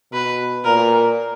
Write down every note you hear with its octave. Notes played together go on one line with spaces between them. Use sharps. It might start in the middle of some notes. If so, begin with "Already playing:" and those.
B2 B4
A#2 A#4